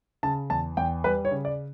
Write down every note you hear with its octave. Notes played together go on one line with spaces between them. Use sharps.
C#3 A5
E2 A5
E2 G5
G3 B4
C#5
C#3
D5